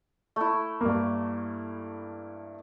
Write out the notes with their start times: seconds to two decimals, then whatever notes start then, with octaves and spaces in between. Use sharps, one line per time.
0.36 A3 E4
0.81 G2 A#3